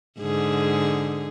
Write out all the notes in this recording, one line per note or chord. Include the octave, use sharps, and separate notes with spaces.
G#2 D3 G#4